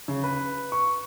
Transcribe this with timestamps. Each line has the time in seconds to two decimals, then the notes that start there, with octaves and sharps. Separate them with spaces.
0.08 C#3
0.23 B4
0.72 C#6